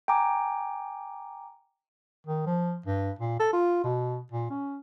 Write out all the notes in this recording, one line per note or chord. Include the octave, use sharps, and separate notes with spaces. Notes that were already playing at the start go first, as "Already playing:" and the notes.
G5 G#5 A#5 D6
D#3
F3
G2
A#2
A4
F4
B2
A#2
C#4